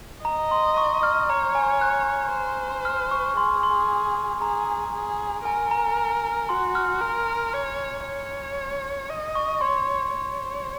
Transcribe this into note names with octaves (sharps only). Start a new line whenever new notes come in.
D#5 A#5
C6
C#6
F6
C#5 A#5
G#5
F#6
C5
F6
C#6
G#4 C6
C6
G#4 A#5
G#4
A#4 G#5
A#5
F#4 C6
F6
A#4
C#5
C#5
D#5
C#6
C#5 C6
C#5